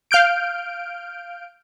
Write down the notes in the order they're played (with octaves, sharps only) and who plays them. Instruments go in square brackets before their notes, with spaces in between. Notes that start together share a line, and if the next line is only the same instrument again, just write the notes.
[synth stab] F5 F6 G6 D7